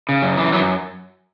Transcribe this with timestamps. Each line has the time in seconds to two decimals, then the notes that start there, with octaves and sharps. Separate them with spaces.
0.09 C#3
0.23 F#2
0.37 E3
0.53 F#2 E3 F#3